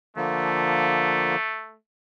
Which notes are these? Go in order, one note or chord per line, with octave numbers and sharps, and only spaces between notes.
D3 F3 A3 A#3